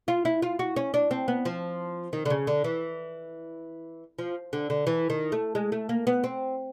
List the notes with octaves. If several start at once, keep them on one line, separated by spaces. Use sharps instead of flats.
F4
E4
F4
F#4
C#4
D4
C4
B3
F3
D#3
D3
C#3
D3
E3
F3
D3
D3
E3
D#3
A3
G#3
A3
A#3
B3
C4